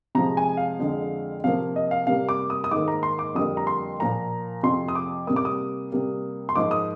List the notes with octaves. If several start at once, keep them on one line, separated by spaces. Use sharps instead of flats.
C3 F3 G#3 A#5
G#5
F5
F2 D3 G#3
C3 F3 A#3 F5
D#5
F5
C3 G3 A#3 F5
D6
D#6
D#6
G#2 D#3 A#3 D6
A#5
C6
D6
F2 D3 G3 A#3 D#6
A#5
C6
A#2 F3 A#3 A#5
F2 C3 F3 C6
D#6
D6
C3 G3 A#3 D#6
D6
D#6
C3 G3 A#3
C6
G#2 F3 A#3 D6
D#6